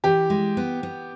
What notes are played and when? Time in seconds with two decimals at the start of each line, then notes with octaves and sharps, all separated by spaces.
0.04 E3 G4
0.30 G#3
0.57 B3
0.83 B3